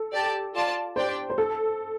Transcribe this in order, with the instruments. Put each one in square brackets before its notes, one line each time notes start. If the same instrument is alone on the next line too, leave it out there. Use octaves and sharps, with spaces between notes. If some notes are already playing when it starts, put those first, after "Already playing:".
Already playing: [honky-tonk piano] A4
[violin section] G4 D5 A5
F4 D5 A5
[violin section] D4 G4 D5 G5 [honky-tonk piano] C5
[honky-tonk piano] C5
A4